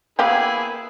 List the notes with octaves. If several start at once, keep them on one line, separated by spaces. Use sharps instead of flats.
A#3 B3 E4 G4 G#4 B4